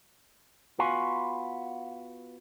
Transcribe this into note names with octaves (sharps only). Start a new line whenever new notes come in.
B3 F4 F#4 F5 G#5